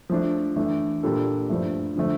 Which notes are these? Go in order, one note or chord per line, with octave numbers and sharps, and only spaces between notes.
F3 A3 D4
E3 A3 D4
A#2 G3 D4 A4
G2 F3 A3
D3 F3 A3